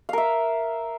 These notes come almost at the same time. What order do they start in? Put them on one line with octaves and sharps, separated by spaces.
F5 A#4 E5